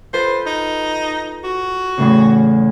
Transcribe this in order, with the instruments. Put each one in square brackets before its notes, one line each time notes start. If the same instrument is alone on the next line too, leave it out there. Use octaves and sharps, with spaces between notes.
[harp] F4 A4 B4 [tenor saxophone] C5
[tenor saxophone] D#4
F#4
[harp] E2 A2 C#3